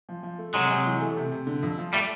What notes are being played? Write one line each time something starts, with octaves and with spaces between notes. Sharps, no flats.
F3
F3
A3
C3 F#3 G#3
C3
E3
A3
C3
C3
D3
F2
F3
G3 A3